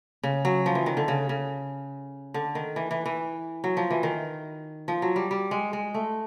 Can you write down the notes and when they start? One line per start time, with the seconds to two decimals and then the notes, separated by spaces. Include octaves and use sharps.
0.23 C#3
0.45 F#3
0.66 F3
0.75 E3
0.86 D#3
0.97 D3
1.08 C#3
1.29 C#3
2.34 D3
2.55 D#3
2.76 E3
2.91 E3
3.06 E3
3.64 F#3
3.77 F3
3.91 E3
4.03 D#3
4.88 F3
5.02 F#3
5.16 G3
5.31 G3
5.51 G#3
5.73 G#3
5.94 A3